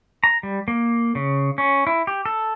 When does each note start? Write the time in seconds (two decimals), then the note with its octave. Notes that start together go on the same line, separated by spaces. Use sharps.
0.24 A#5
0.43 G3
0.68 A#3
1.15 C#3
1.58 C#4
1.87 E4
2.07 G4
2.26 A4